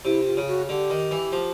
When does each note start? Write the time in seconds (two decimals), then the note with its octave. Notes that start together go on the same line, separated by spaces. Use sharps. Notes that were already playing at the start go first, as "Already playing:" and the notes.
0.05 C3 E4
0.26 F4
0.37 C#3
0.48 F#4
0.69 D3 G4
0.90 D#3
1.11 E3
1.32 F3